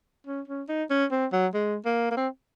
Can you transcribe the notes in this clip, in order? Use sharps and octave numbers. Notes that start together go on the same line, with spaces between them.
C#4
C#4
D#4
C#4
C4
F#3
G#3
A#3
A#3
C4